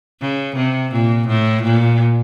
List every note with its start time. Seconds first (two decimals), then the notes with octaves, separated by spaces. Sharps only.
0.21 C#3
0.56 C3
0.92 A#2
1.28 A2
1.63 A#2